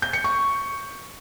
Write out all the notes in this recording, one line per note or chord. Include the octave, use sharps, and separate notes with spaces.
G6
C#7
C#6